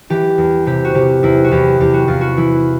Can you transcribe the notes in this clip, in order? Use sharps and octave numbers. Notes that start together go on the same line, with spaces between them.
E3 G4
E2
C3 G4
F#4
C3 G4
E2 E4
F#4
E2 G4
E2 G4
F#4
E2 F4
F#4
E3 E4